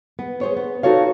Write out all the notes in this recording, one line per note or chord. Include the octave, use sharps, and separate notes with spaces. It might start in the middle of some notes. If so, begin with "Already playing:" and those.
B3
G#4 C5 C#5
B3
D#4 F#4 A4 C#5 F5